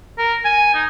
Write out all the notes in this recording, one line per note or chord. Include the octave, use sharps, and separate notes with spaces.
A#4
G#5
D#4